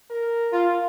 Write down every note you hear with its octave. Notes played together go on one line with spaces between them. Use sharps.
A#4
F4